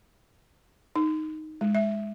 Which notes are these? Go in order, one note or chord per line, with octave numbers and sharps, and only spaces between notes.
D#4
G#3
E5